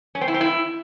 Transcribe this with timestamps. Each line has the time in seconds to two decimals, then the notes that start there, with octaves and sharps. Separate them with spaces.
0.15 C#4
0.21 C4
0.28 E4
0.34 C4
0.41 E4